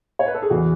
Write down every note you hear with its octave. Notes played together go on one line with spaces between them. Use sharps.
C#5
B4
A4
G#4
E2 F#4